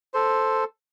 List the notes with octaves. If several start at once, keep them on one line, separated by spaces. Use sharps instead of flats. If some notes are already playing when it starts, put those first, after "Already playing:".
A4 C5